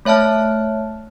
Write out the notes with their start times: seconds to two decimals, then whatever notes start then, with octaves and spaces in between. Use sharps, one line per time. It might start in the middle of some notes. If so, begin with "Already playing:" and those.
0.05 A3 C#5 E5 A5 F6